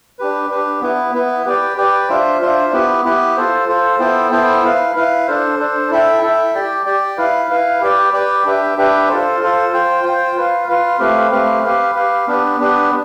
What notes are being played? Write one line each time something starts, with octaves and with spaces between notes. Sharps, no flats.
D4 G4 B4
D4 G4 B4
B3 E4 B4
B3 E4 B4
G4 B4 D5 G5
G4 B4 D5 G5
D4 F4 C5 E5
D4 F4 C5 E5
B3 E4 G4 B4
B3 E4 G4 B4
F4 A4 C5
F4 A4 C5
B3 E4 A4 C5 G5
B3 E4 A4 C5 G5
E4 B4 F5
E4 B4 F5
D4 A4 C5
D4 A4 C5
E4 A4 E5 G5
E4 A4 E5 G5
G4 D5 G5
G4 D5 G5
E4 B4 F5
E4 B4 F5
G4 B4 D5 G5
G4 B4 D5 G5
D4 G4 B4 E5 G5
D4 G4 B4 E5 G5
F4 A4 C5
F4 A4 C5
F4 C5 G5
F4 C5 G5
F4 B4 F5
F4 B4 F5
A3 C4 G4 B4 F5
A3 C4 G4 B4 F5
G4 B4 F5
G4 B4 F5
B3 D4 G4 B4
B3 D4 G4 B4